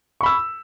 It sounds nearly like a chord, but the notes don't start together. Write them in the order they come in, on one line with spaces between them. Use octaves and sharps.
C#6 B5 E6